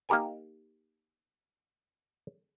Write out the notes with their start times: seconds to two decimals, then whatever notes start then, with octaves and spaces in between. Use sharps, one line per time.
0.09 A#3 D#4 G4 A#4 G#5